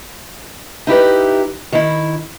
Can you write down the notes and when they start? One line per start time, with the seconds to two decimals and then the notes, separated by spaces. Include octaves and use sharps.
0.87 D#4 E4 G4 B4
1.72 D#3 E4